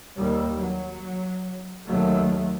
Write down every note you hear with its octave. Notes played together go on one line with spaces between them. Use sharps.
D#2 G3
F#3
D#2 F#3 A3